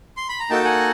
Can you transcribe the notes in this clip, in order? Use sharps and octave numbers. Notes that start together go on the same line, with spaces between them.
C6
B5
A#5
A#3 D#4 F#4 A4 G5 A5
F#5 G#5